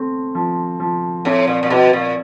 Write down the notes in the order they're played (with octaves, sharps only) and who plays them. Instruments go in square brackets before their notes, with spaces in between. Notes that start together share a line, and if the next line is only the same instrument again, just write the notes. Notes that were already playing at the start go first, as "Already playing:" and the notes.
Already playing: [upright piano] A3 C4
F3
F3
[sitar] A2 [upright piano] C4
[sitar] A#2
A#2
[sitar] B2 [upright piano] E4
[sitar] A#2